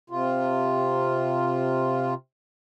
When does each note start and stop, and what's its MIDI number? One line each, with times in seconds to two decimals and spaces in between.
0.10 2.14 48
0.10 2.14 65